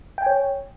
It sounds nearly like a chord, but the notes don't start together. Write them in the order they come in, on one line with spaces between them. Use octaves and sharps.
G5 G#5 C#5